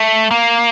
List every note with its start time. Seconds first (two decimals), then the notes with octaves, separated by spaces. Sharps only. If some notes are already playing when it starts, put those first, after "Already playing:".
Already playing: A3
0.31 A#3